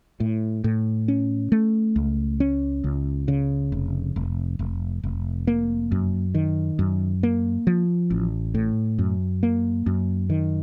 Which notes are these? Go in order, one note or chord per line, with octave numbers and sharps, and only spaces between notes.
A2
A2
C#4
A3
C#2
C#4
C#2
C#3
F1
F1
F1
F1
A#3
F#2
D#3
F#2
A#3
F3
A1
A2
F#2
A#3
F#2
D#3